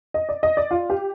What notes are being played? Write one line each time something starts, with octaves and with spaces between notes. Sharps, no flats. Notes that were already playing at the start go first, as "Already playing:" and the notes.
D#5
D5
D#5
D5
F4
G4